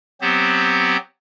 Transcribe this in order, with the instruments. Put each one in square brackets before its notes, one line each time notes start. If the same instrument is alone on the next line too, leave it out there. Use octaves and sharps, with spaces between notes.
[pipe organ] F#3 B3 C4 G4 C5